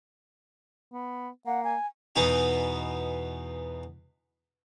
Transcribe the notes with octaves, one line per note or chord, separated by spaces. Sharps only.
B3
A#3 F#5
G#5
E2 B2 B3 D#4 G#5